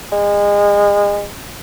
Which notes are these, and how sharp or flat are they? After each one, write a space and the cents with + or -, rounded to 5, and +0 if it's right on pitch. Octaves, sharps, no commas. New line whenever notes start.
G#3 -30